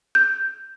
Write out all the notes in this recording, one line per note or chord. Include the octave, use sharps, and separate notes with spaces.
G6